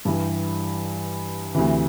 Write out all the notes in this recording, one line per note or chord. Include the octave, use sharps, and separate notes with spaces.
G2 E3 G3
D2 C3 E3